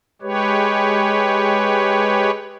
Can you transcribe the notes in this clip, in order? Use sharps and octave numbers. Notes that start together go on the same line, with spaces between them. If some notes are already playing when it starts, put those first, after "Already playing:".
G#3 G4 B4 C#5